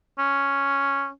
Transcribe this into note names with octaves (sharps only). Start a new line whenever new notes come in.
C#4